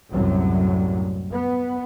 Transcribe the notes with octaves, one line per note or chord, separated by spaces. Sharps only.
C2 F#2 A2 C3 F#3
B3